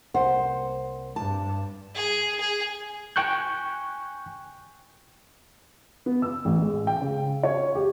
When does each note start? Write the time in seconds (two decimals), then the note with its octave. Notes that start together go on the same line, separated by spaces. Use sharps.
0.14 C2 A#3 C5 F#5
1.16 G2 A5
1.94 G#4
2.40 G#4
3.16 G5 G#5 C#6 F#6 G6
6.06 B3
6.22 E6
6.45 A1
6.60 G#3
6.87 G5
7.01 C#3
7.43 C#5
7.75 G4